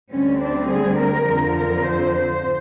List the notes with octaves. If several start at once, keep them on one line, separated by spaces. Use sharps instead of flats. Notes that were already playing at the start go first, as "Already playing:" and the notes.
D2 D3 G3 C4 C#4
D4
G#4
A#4
F2 D3 F3
A#4
C5
C5